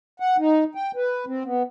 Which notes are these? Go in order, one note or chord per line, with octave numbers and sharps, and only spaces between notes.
F#5
D#4
G5
B4
C4
B3